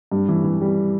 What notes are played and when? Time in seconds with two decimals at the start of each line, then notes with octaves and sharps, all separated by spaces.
0.11 G2
0.28 E3
0.44 E3
0.61 G3